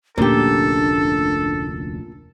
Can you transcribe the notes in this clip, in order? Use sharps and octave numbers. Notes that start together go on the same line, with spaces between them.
F1 D2 A#2 C#4 D4 G4 A4